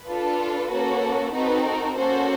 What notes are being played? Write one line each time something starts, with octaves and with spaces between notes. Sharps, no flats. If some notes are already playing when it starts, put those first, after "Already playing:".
Already playing: B4
D4 F4 A4
A#3 C#4 F#4 A4
C4 D#4 F#4 A4 B4
A#4
A#3 C#4 F#4 A4 C5